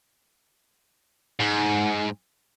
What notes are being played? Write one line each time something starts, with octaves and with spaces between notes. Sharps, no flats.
G#2